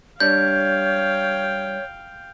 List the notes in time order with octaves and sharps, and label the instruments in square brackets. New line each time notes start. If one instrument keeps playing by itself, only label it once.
[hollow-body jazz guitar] G3 D4 [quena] C#5 [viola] F5 G5 [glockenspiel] G6